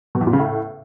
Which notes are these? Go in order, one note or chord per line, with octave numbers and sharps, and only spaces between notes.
B2
E2
A#2
C#3
A2